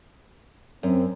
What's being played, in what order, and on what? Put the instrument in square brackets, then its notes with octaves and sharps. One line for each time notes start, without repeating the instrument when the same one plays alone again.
[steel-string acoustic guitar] F#2 [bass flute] C4